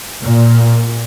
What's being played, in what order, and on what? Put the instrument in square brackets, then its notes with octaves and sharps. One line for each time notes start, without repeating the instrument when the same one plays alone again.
[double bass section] A#2